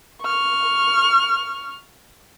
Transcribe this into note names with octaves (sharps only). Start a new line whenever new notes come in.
C#6 F6